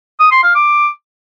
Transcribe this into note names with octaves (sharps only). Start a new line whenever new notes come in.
D#6
C6
F5
D6